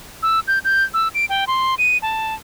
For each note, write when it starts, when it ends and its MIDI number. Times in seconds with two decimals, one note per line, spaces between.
0.23 0.40 88
0.48 0.59 91
0.65 0.84 91
0.94 1.08 88
1.14 1.25 98
1.29 1.45 79
1.47 1.75 84
1.78 1.98 99
2.02 2.34 81